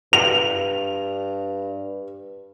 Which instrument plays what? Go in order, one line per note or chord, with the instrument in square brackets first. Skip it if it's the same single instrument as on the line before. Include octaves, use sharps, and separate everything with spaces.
[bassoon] G2 [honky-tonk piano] F7